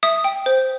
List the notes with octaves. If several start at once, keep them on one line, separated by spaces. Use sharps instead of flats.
E5 D#6
G5
C5